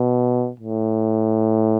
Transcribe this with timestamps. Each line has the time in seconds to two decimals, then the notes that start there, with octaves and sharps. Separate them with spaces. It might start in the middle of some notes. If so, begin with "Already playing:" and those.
Already playing: B2
0.60 A2